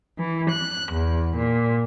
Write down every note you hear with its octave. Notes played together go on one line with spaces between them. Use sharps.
E3
F#6
E2
A#2